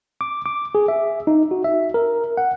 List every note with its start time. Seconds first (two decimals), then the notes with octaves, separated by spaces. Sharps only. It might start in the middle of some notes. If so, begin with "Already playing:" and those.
0.21 D6
0.46 D6
0.75 G#4
0.88 E5
1.27 D#4
1.51 F#4
1.64 E5
1.94 A#4
2.37 F#5